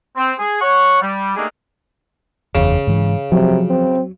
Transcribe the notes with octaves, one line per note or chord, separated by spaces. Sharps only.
C4
G#4
C#5 F#5 C#6
G3
A3 A#3 D4 D#4 G4 G#4
F#1 E2 C#3
G#2 E3
C3 F3 F#3
C4